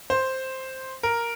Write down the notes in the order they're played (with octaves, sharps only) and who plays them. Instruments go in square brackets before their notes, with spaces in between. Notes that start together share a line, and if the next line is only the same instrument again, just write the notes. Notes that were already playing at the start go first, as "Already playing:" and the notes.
[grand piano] C5
A#4